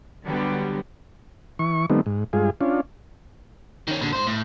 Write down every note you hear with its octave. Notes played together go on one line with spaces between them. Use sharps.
D3 F#3 G3 B3
E3 C#6
D#3 G3 A3 B3 C4 D#4
G#2
G2 G#3 F4 G#4
C#4 D4 F4
D#3 C#4
A#2 D3
G#2 C5
A2